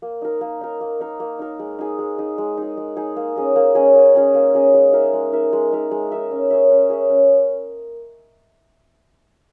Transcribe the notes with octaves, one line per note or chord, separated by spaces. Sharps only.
A#3
D#4 A#4
A#3
D#4 A#4
A#3
D#4 A#4
A#3
D#4 A#4
G#3
D#4 G#4
G#3
D#4 G#4
G#3
D#4 G#4
G#3
D#4 G#4
A#3
C#4 G#4 D#5
A#3
C#4 G#4 D#5
A#3
C#4 G#4 D#5
A#3
C#4 G#4 D#5
G#3
D#4 A#4 E5
G#3
D#4 A#4 E5
G#3
D#4 A#4 E5
G#3
D#4 A#4 E5
C#4
G#4 C#5 E5
C#4
G#4 C#5 E5
C#4